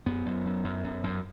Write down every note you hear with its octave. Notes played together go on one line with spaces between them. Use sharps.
F#2 B3
F#2
F#2
F#2
F#2
F#2